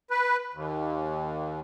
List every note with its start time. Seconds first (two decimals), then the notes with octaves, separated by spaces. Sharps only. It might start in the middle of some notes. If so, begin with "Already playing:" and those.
0.10 B4
0.54 D#2